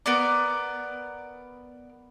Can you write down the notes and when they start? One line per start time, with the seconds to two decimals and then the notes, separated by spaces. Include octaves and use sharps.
0.06 B3 A#4 D5